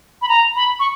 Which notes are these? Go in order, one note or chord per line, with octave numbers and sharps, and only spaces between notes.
B5
A#5
B5
C#6